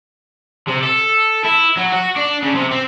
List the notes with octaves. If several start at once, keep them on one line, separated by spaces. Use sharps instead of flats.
C3
A4
E4
F#3
F#4
D4
C#3
C3
C4